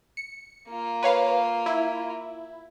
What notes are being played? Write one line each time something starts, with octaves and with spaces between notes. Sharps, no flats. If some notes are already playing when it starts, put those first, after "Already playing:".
C#7
A#3 F4
B4 C#5 F5
E4